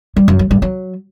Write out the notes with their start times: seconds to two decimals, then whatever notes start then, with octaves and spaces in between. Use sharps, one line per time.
0.17 G3
0.28 F#2
0.39 F#3
0.51 G2
0.62 F#3